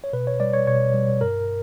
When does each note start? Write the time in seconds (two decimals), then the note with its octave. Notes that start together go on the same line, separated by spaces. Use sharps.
0.04 C#5
0.13 B2 B4
0.27 C#5
0.40 G3 D5
0.54 C#5
0.67 B2 C#5
0.94 G3
1.21 G2 A#4